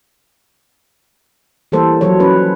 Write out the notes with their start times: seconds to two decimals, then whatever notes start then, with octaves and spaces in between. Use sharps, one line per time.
1.72 E3 G3 A#3 A4 C5
2.01 F3 F#3 A4 C#5
2.20 C#4 B4